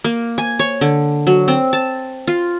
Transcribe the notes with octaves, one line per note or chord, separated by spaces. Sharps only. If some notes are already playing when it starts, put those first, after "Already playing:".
A#3
G#5
C#5
D3
F#3
C4
A5
F4